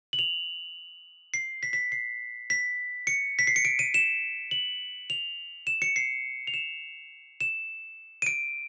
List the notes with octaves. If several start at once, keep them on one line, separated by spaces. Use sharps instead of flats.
F#7
F7
C7
B6
B6
C7
B6
C#7
B6
C7
C#7
D7
D#7
E7
F#7
F7
E7
C#7
C7
F7
E7
E7
D#7
D7